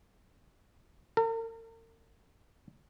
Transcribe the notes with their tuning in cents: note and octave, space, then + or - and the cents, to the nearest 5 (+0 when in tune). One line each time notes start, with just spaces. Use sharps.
A#4 -45